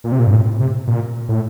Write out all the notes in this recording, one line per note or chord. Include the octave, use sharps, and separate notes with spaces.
A#2
C3
A#2
G2
A2
C3
A#2
A2